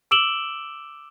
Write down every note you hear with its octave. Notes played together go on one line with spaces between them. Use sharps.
D6 E6 D7 E7 F#7 G7